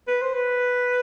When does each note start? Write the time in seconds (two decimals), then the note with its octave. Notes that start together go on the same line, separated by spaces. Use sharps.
0.08 B4
0.21 C5
0.34 B4